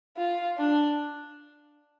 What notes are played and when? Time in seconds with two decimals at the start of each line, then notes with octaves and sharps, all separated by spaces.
0.17 F4
0.58 D4